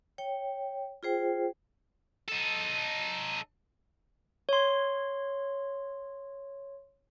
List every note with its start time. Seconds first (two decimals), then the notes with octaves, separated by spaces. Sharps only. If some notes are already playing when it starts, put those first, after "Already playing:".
0.18 C#5 G5
1.03 F4 G#4 C5 G5
2.28 D#4 A4
4.49 C#5 C6